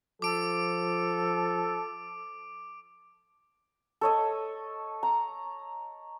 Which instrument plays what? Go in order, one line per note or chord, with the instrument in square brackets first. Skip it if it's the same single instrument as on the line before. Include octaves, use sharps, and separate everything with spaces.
[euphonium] F3 [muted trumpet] A4 [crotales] D6 D7
[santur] A4 C#5 D#5
A#5